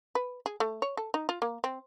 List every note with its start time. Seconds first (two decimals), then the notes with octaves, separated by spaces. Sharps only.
0.15 B4
0.46 G#4
0.60 A3
0.82 C#5
0.97 A4
1.14 D#4
1.29 F4
1.42 A#3
1.64 C4